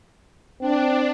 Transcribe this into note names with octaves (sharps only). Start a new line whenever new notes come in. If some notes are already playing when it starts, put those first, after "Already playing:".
C4 D4